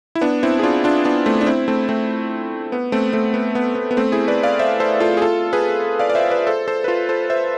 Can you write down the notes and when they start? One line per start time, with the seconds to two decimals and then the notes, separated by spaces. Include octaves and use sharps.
0.15 E4
0.21 B3 D4
0.43 C4 E4
0.59 G#4
0.63 D4 F4
0.84 D4 F4
1.05 B3 D4
1.26 A3 C4
1.41 D4
1.46 C4 E4
1.68 A3 C4
1.89 A3 C4
2.72 B3
2.92 A3 C4
3.13 A3 C4
3.34 B3
3.55 B3
3.75 B3
3.91 B3
3.97 A3 C4
4.12 E4 G#4
4.28 B4 D5
4.43 D5 F5
4.59 C5 E5
4.80 A4 C5
5.00 F4 A4
5.17 G#4
5.22 F4 A4
5.53 G#4 B4
5.99 D5 F5
6.09 D5
6.15 C5 E5
6.30 B4 D5
6.47 A4 C5
6.68 A4 C5
6.84 B4
6.88 F4 A4
7.09 A4 C5
7.30 C5 E5